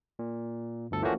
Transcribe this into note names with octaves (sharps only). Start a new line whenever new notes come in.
A#2
G1 D2 A4
E3 F3 A3 A#3 C#4 F#4